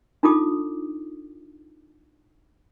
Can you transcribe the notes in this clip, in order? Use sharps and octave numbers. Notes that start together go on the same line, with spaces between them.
D4 D#4 F4 A4 D6 D#6